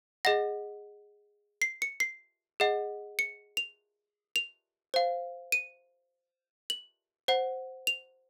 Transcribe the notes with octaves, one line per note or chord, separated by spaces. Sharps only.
G#4 D#5 F#5 A#6
C7
C#7
C7
G#4 D#5 F#5
C#7
F7
F7
C5 F5
D#7
F#7
C5 F#5
F7